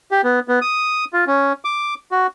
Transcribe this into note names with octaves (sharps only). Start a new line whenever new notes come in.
G4
B3
B3
D#6
F4
C#4
D6
F#4